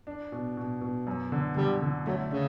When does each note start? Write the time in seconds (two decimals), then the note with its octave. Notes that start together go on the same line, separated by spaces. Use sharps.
0.07 D4
0.32 B2
0.57 B2
0.81 B2
1.07 F#2
1.32 D3
1.56 D3 G3
1.82 D3
2.07 F#3 A3
2.31 C#3 C#4